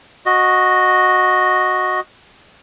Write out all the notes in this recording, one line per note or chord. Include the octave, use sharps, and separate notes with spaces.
F#4 D#5